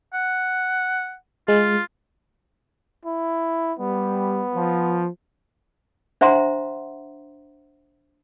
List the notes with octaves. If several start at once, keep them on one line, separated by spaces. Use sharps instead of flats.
F#5
G#3 F4
E4
G3 B3
F3
D4 C5 E5 F#5 A#5 C6